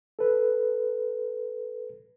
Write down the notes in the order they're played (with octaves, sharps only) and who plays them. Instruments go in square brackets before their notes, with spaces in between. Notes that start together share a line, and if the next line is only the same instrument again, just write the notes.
[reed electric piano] A4 B4